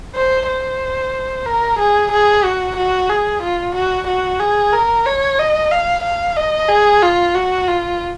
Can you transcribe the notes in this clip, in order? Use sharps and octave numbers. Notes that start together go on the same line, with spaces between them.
C5
C5
A#4
G#4
G#4
F#4
F#4
G#4
F4
F#4
F#4
G#4
A#4
C#5
D#5
F5
F5
D#5
G#4
F4
F#4
F4